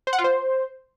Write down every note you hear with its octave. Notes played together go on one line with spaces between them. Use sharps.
C5
F#5
F4
C5